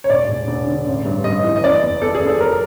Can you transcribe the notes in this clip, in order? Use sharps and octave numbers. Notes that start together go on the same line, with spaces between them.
C#5
E1 D5
E1
E1
D3
A1
G2
G2 D#5
E3
D#5
F#1 D5
E2
E2 A4
G#4
F#1
A4
F#3 A#4